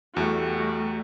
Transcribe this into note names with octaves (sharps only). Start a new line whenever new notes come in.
E2 G3 A3 F#4